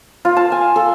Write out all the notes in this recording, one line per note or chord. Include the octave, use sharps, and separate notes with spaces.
F4
A5
G#5
A4